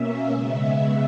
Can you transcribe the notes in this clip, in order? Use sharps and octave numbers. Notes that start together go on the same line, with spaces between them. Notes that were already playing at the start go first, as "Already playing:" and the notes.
Already playing: B2 A#3 C#4 E5
C#3 G#3 B3